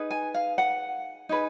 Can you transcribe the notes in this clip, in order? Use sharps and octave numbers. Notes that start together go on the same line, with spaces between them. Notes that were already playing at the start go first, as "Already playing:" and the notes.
Already playing: D#4 G#4 B4
G#5
F5
F#5
D#4 G#4 B4